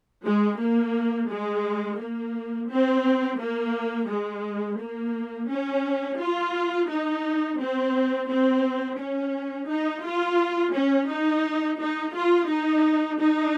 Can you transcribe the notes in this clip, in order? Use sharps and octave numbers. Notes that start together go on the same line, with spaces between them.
G#3
A#3
G#3
A#3
C4
A#3
G#3
A#3
C#4
F4
D#4
C4
C4
C#4
D#4
F4
C#4
D#4
D#4
F4
D#4
D#4